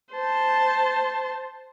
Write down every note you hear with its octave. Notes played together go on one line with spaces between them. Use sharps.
C5 A5